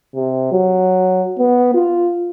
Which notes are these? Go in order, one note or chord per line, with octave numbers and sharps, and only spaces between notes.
C3
F#3
B3
F4